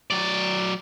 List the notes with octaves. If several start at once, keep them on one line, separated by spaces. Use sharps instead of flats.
F#3 D5